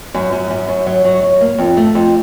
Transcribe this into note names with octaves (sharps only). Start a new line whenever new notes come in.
F#2
F#2
F#2
F#2
F#3
F#3
F#3
A#3
F2
A3
F2